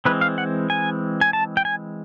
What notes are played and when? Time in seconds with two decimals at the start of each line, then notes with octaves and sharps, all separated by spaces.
0.05 E3 G#3 C4 B4
0.21 F5
0.38 F#5
0.70 G#5
1.21 G#5
1.33 A5
1.57 G5
1.65 G#5